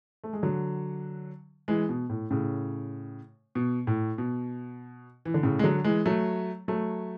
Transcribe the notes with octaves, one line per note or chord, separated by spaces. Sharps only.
A3
G#3
D3 F#3
E3 G#3
B2
A2
A2 C#3
B2
A2
B2
E3
D3
A2 C#3
G#3
D3 F#3
E3 G#3
F#3 A3
F#3 A3